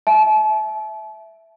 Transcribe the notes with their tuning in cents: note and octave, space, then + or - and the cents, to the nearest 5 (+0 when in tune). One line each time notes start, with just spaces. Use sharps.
E5 +0 A5 -40